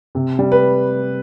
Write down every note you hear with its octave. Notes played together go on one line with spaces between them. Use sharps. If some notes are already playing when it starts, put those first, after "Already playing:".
C3
G3
B4